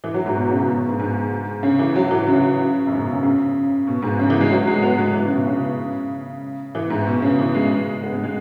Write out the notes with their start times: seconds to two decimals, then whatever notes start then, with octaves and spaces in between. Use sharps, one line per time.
0.04 E3
0.14 F#3
0.26 G#2
0.36 B2
0.46 B2
0.51 C#3
0.68 B2
0.79 B2
0.89 G#2
1.00 G#2
1.63 C#3
1.79 E3
1.96 F#3
2.11 E3
2.27 C#3
2.87 F#2
2.92 G#2
3.02 B2
3.12 C#3
3.23 C#3
3.87 B2
4.02 G#2
4.19 C#3
4.30 E3
4.41 G#3
4.51 F#3
4.67 G#3
4.82 B3
4.99 G#3
5.14 E3
5.25 C#3
5.36 B2
5.47 C#3
6.75 E3
6.90 G#2
7.07 B2
7.22 C#3
7.39 E3
7.55 G#3
8.03 B3
8.13 G#3
8.23 G#3